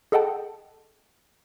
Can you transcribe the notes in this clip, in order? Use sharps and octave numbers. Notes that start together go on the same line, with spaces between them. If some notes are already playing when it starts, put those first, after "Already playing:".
G#4 A4 D#5 F#5 G5 A5